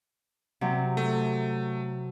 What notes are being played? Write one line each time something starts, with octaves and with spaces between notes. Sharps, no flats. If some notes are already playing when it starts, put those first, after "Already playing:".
C3 F#3
A3